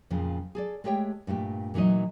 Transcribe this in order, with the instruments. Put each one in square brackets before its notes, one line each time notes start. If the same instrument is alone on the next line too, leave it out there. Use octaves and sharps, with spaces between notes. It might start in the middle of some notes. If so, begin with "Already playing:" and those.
[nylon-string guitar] F2 A#2 C#3 F3
G#4 A4 D5
G#3 A3 G4 C#5 G5
G2 A#2 A3 G4
A#2 E3 F#3 D#4 D#5